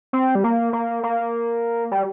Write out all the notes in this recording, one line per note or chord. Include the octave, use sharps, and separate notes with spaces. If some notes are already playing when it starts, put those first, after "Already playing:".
C4
G3
A#3
A#3
A#3
G3